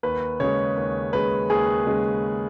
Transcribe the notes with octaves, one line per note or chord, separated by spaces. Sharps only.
D#2 B4
C#3 G#3 C#5
D#2
C#3 G#3 B4
D#2 G#4
C#3 G#3